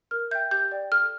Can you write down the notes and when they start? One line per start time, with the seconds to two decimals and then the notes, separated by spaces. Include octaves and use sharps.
0.11 A#4 F6
0.31 E5 G6
0.35 G5
0.51 G4 G6
0.72 D5 G5
0.92 A4 F6